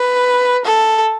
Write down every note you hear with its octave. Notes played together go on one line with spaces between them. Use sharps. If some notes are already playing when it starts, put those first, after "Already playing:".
Already playing: B4
A4